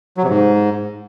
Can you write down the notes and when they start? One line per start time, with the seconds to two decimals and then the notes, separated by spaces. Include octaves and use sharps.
0.17 F#3
0.23 C3
0.29 G#2